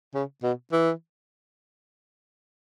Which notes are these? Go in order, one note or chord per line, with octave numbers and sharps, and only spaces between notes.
C#3
B2
E3